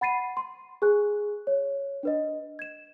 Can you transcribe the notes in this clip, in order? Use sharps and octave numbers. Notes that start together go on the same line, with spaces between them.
F#5 B5 A6 C7 D#7
C6
G#4 B4 G#5 F#6
C#5
D4 B4 D#5
G#6 E7